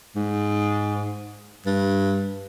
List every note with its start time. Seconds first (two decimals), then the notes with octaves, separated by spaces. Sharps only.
0.16 G#2
1.66 G2